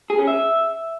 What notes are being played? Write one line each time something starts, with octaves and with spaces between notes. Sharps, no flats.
G#4
C#4
E5